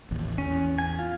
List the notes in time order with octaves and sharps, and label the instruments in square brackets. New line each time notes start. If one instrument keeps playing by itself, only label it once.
[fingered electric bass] A1 D#2
[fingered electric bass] E2 [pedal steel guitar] C#4
[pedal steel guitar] G#5
F4